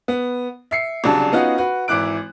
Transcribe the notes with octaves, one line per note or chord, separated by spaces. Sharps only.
B3
E5 C7 C#7
C2 C#3 F#3 D4 A5
B3 C#4 D#4 F4 F#4
F#4 B4
G#1 E3 E4 D6 F#6 D7